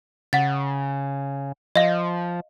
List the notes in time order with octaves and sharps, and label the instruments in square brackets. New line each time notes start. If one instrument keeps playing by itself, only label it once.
[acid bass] C#3 [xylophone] F#5 A6
[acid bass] F3 [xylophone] D#5 F5